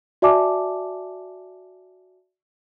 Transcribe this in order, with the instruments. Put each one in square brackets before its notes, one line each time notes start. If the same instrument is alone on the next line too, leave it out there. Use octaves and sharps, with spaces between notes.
[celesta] F#4 D5 E5 G#5 A5 D6